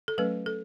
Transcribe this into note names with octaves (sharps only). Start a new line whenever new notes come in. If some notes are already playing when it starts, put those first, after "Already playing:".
A4
F#3 A3 C#4 B4
A4